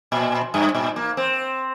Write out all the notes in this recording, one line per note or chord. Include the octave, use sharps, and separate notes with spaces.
A#2
G2
A#2
A#3
C4